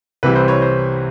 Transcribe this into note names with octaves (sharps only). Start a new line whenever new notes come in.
C2 C3 E3 G3 B4
C5
C#5
C5